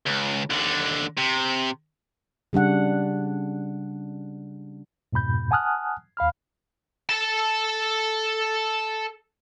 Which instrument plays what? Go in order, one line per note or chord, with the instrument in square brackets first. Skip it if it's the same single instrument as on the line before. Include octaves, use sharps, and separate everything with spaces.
[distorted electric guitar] C#2
D#2 D3
C3
[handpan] C#3 G3 D4 F#5
[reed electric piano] F2 G#2 B2 B5 G6
F#5 G#5 A5 D#6 F6 F#6
D#2 F5 B5 F6
[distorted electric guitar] A4 A5